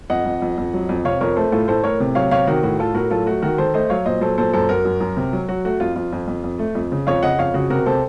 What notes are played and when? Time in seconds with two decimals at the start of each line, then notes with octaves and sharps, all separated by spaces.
0.10 F2 D#5 F#5
0.25 F2
0.42 F2
0.58 F2
0.74 F#3
0.89 F2
1.05 C3 C#5 F5
1.21 F2 A#4 C#5
1.36 A3 A4 C5
1.52 A2 F4 A4
1.68 A2 A4 C5
1.84 A2 A#4 C#5
2.00 C3
2.15 F#3 C#5 F5
2.31 C3 C#5 F5
2.47 D#3 F#4 A#4
2.63 A2 F#4
2.79 A2 F4 A4
2.94 A2 F#4 A#4
3.11 F#3 F4 A4
3.26 A3 F#4
3.42 D#3 F#4 A#4
3.58 D#3 A4 C5
3.74 A3 C5 D#5
3.90 F#3 C#5 F5
4.06 A#2 C5 D#5
4.21 F#3 A4 C5
4.38 A#2 A4 C5
4.53 F#2 A4 C5
4.69 F#2 F#4 A#4
4.85 F#2
5.00 F#2
5.17 C3
5.33 F#3
5.48 F#3 F#4
5.65 A3 F#4
5.80 F2 F4
5.96 F2 F4
6.13 F2
6.28 F2
6.44 F2
6.59 A3
6.75 F2
6.92 C#3
7.07 F2 C#5 F5
7.23 C#3 D#5 F#5
7.39 F2 C#5 F5
7.54 C#3 F#4
7.70 C3 F#4 A#4
7.86 C3 A4 C5